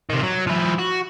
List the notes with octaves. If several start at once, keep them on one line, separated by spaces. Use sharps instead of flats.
C3 D#3
F#3
F3 E4
F#4